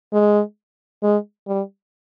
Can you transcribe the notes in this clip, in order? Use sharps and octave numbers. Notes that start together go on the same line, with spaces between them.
G#3
G#3
G3